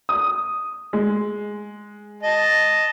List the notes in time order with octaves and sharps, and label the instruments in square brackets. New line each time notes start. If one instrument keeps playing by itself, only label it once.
[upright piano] D#6
G#3
[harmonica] D#5 A5